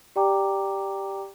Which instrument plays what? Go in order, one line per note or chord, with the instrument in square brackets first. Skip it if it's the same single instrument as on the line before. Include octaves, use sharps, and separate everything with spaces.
[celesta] G4 D5 G5 A#5 D6